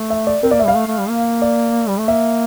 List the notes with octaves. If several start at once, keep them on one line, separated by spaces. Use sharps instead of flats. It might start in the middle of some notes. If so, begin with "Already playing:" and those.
Already playing: A3
E5
D5
C4 A#4
A#3 D5
E5
G3 F5
A3
A3
G3
A#3
D5
G3
A3
A#3 E5